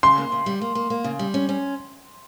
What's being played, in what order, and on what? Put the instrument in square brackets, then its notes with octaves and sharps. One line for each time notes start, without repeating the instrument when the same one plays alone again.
[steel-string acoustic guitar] C#3 [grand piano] C6
[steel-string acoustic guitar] A#3
C#3
G3
A#3
A#3
A#3
C#3
G3
C#4
C#4